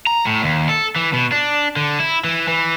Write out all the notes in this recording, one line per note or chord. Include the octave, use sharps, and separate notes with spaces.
A#5
A2
D#2
A4
E3
B2
D4
D3
E4
E3
E3